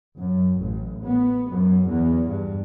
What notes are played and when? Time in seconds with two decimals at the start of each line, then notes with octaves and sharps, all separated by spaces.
0.18 F#2
0.60 A1
1.02 B3
1.50 F#2
1.88 E2
2.28 G2